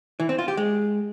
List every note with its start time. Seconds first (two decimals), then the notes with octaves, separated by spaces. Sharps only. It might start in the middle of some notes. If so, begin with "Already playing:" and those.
0.20 E3
0.29 C4
0.38 F4
0.48 G4
0.57 G#3